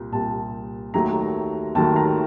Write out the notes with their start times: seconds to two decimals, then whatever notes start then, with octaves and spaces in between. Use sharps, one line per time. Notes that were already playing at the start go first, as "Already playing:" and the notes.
Already playing: C2 A#2
0.12 C2 A#2 G3 A5
0.94 D#2 D#3 F#3 A3 A#5
1.75 D#2 D#3 F#3 A3 A5
1.96 A#5